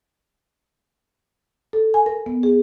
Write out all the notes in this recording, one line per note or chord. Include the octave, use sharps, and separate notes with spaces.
A4
G#5
A#4
B3
G#4